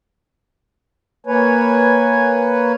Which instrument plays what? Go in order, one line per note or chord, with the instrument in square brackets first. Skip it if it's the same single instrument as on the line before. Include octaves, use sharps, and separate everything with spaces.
[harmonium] A#3 B4 C#5 [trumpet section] G#5